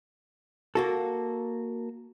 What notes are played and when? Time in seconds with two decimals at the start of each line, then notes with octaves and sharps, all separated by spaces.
0.75 A#3 F#4 A4